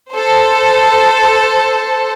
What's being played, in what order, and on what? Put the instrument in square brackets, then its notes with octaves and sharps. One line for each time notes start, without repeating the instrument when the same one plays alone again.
[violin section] A4 C5